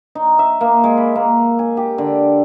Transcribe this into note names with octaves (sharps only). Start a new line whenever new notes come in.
D#4
E5
A#3
G#3
B5
A#3
G#5
G4
D3